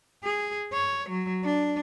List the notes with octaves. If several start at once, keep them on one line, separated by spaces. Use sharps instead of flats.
G#4
C#5
F#3
D4